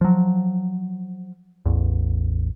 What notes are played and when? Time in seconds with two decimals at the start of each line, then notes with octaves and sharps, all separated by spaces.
0.01 F3 F#3
1.66 A1 E2